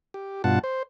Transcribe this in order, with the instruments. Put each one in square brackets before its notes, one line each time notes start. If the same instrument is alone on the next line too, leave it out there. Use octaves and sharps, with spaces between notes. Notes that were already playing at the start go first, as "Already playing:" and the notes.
[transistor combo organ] G4
G2 B2 F4 F#5 A5
C5